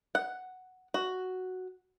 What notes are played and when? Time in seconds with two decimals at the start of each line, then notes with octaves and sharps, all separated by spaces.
0.15 F#5
0.94 F#4